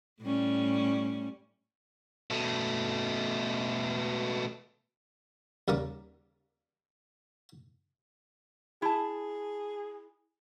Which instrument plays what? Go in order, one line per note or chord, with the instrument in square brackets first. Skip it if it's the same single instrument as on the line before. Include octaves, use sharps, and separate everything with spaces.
[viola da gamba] A2 G3 C#4
[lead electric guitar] B2 A3
[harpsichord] D#2 C#3 G3 A#4 D6
[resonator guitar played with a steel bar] E4 A5 [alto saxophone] G#4